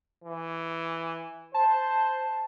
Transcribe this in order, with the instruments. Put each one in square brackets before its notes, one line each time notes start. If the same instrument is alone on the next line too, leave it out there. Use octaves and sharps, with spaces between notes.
[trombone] E3
[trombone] C5 [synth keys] A5